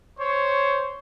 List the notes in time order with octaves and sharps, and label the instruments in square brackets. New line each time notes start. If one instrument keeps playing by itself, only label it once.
[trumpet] C5 [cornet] C#5